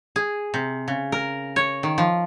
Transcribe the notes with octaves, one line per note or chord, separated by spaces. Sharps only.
G#4
C3
C#3
A#4
C#5
D#3
F3